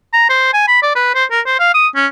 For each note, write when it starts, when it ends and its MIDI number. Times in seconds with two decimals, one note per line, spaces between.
0.13 0.26 82
0.29 0.53 72
0.53 0.65 80
0.68 0.82 83
0.82 0.92 74
0.95 1.13 71
1.15 1.25 72
1.31 1.40 70
1.46 1.58 72
1.60 1.72 77
1.74 1.87 87
1.95 2.06 61